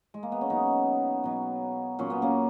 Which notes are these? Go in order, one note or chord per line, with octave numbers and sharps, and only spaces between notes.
G#3
A#3
B3
C#4
B2 F#3 B3 D#4
B2 F#3
A#2 F#3 C#4
B3
A#3 C#4